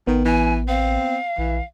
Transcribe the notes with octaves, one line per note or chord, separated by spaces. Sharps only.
A1 D#3 B3
E3 G#5
C4 F5
A#1 E3